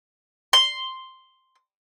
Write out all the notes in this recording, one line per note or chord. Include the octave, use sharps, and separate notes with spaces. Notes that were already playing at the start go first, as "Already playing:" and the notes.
C6